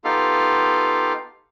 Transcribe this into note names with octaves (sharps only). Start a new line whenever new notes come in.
B3 D#4 F4 G4 A4 F5